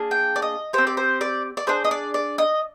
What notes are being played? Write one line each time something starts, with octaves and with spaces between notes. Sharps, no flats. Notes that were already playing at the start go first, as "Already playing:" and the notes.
Already playing: A#3 D4 G#4
G5
D5
D#5
C4 G4 C5
D5
C5
D5
D5
D4 G#4 C5
D#5
D5
D5
D#5